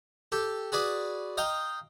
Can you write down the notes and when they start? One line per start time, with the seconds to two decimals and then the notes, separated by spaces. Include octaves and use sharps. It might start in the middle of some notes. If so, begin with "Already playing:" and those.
0.32 G4 A4
0.72 F#4 G#4 B4 D5
1.37 D#5 F5 G5 A#5